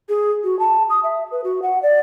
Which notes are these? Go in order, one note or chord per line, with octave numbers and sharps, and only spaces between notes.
G#4
F#4
A5
D#6
E5
B4
F#4
F#5
D5